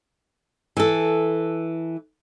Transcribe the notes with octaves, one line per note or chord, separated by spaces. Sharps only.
E3 A4